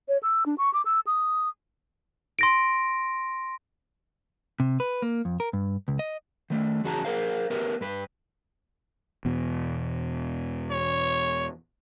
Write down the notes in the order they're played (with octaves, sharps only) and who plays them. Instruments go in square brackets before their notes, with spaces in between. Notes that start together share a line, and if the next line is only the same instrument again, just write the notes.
[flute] C#5
E6
D4
C#6
D6
E6
D#6
[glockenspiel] C6 A#6 D7
[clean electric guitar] C3
B4
A#3
F2
A#4
G2
C#2
D#5
D#3 A3
E2 C#3 F#4 G#4 A5 A#5
G#4 A#4 C5 F5
B3 G4 A#4 B4 E5
G2 B4
[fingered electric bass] E2 B2
[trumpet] C#5